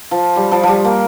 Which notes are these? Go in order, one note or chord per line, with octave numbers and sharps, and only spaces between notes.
F3
G3
F3
F3 G3
A#3